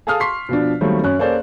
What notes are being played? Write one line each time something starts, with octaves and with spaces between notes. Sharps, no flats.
G#4 A4 F5 A5 D#6 F6
C6 C#6 B6 C7
B2 F3 D4
D#3 F#3 G3 A3 A#3 C4
F#2 C#4 F#6
A#3 C#4 G#4 A4 C5 D5